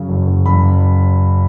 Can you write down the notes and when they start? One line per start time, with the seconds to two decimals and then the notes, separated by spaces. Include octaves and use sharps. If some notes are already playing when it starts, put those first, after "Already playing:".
Already playing: F#2 C#3
0.09 F#1
0.27 F#1
0.46 F#1 B5